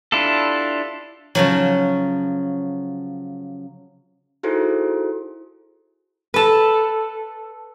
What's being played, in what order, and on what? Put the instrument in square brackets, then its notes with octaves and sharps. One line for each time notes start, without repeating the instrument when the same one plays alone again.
[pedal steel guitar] D4 E4 F4 G4 A4
[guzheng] C#3 F3 F#3
[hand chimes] D#4 E4 F#4 G#4 A4 C5
[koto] A4 B4